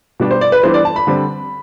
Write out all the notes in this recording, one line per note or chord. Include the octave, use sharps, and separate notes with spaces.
B2 G3 D4
C5
D5
B4
E3 G3 B3 D4 C5
D5
A5
B5
D3 G3 C4